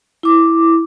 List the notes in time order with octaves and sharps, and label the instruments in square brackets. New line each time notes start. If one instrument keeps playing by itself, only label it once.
[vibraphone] E4 D6